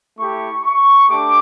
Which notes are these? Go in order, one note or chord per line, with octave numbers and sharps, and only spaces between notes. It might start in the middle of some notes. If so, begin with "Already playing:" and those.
A3 E4 G4 C#6
C#6
A3 D4 G4 D6